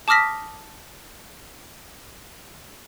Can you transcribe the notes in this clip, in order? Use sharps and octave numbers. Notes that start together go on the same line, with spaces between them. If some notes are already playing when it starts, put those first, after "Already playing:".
A5 D6 D#6 F6 A#6 B6